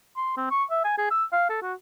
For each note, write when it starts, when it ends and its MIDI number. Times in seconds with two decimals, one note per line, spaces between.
0.17 0.36 84
0.37 0.51 60
0.51 0.64 85
0.70 0.79 76
0.84 0.94 80
0.98 1.07 68
1.11 1.24 88
1.33 1.45 77
1.49 1.58 69
1.62 1.74 66